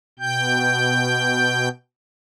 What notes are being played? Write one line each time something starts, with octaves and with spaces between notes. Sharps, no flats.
B2 G5 G6